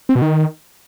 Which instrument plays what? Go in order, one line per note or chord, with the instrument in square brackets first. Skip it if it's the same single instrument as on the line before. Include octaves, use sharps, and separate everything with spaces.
[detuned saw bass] C4
B2
D#3